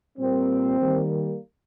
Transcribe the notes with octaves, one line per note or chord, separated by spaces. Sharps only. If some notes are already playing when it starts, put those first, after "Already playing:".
A#2 G3 A#3 C4
D#3 G3 A#3